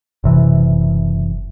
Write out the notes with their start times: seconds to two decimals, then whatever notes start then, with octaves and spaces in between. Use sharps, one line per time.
0.24 F#1 C3 E3